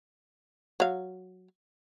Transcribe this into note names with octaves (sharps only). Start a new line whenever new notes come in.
F#3 F5